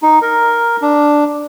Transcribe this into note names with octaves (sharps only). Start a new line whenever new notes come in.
D#4
A#4
D4